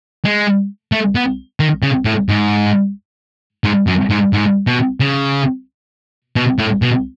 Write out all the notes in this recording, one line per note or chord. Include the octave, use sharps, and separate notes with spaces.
G#3
A3
B3
D#3
C#3
A2
G#2
G#2
F#2
G#2
G#2
B2
C#3
B2
A2
B2